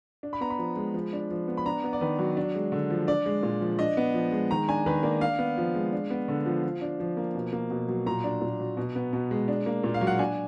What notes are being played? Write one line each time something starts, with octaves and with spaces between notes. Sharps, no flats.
D4
B5
B3 A#5
B5
F3
G#3
F3
D4
F3
B3
B5
D4 A#5
B3
D5
D#3 B4
F#3
D4
G#3
D3
F3
D4 D5
G#3
A#2
F3
D4 D#5
B3
F3
G#3
D#3 A#5
D4 G#5
D#3 B4
A#3 D5
D4 F5
B3
F3
G#3
D4
B3
D3
F3
F3
D4
F3
A#3
B2
A#3
B2
F#3
A#2 A#5
D4
A#2
F#3
B2
B3
B2
G#3
D4
A#3
A#2
F5
F#3
F#5
D4 G#5